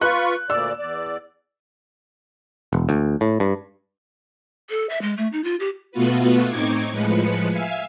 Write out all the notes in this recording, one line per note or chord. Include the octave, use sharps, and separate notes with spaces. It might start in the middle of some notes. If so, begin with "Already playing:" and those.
F4 B4 C#6 F#6
D2 A#2 D5 E6
E2 D5
E1
D2
A2
G2
A4
E5
G#3
A3
D#4
F4
G4
B2 A3 B3 F4 F#4 B4
A2 C4 D#4 C#6 D6 G#6
A2 F3 G#3 B4 C#7
E5 F5 G#5